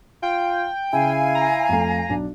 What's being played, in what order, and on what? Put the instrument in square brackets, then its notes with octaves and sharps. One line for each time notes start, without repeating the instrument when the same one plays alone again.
[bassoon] F4 [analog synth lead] G5
[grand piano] C#3 [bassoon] E4 [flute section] F5 G#5
[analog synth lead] A#5
[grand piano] F2 A3
B1 D4